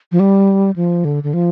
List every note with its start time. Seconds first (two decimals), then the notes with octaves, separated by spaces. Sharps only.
0.12 F3
0.20 G3
0.76 F3
1.05 D3
1.23 D3
1.34 F3